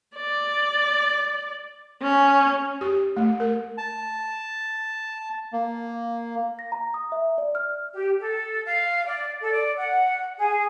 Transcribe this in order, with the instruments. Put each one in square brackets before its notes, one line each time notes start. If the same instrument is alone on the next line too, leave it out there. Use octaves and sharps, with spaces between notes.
[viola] D5
C#4
[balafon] G4
A3
A#4
[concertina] A5
A#3
[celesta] A#6
A#5
D#6
E5
D5
F6
[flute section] G4
A4
F5
D5
A4
D5
F#5
G#4